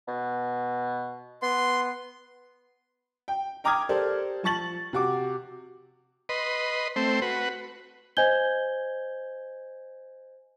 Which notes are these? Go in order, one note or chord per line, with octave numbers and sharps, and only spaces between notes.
B2
B3 C6
G5
G5 A#5 D6 D#6 F6 G#6
G4 A4 A#4 C5 D5
F3 A5 C#6 A6 F#7
C3 F#4 D6
B4 D#5 C6
A3 C4 C5
F#4 B4
C5 D#5 G#5 G6 G#6 G7